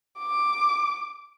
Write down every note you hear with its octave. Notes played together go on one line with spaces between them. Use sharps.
D6